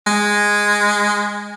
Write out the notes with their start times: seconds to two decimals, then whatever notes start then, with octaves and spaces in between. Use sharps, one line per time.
0.07 G#3